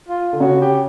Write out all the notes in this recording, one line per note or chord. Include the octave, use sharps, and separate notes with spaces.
F4
D3
C#3 F#4
G4